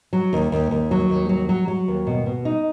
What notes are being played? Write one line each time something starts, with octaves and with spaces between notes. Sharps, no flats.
F#3
D#2
D#2
D#2
F#3
D#2
F#3
F#3
F#3
D#2
B2
B2
D#4